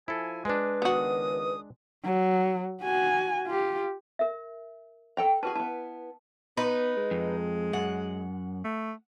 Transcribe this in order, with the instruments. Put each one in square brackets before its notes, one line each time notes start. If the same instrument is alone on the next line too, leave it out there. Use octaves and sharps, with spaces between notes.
[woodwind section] F3 G#5 [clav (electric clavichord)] E4 A4
[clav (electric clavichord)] G#3 D4 [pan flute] B4
[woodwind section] C#2 D#3 D#6 [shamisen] B3 F#4
[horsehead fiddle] F#3
F#4 G#5
F4 G4
[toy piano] A#4 E5
[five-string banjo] A4 G5 A#5
[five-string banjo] E4 F#4 G#4 [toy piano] B4 A5
[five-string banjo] B3 E4 [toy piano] A5
[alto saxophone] B3 [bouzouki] D#4 B4
[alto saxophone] G#3
[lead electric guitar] F2
[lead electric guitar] F#2 [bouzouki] F#5
[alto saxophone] A3